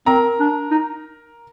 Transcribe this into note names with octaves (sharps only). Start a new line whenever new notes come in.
C4 A#4 A#5
D4
D#4